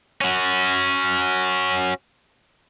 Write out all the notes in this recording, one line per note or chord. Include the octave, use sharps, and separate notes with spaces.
C#4 F#4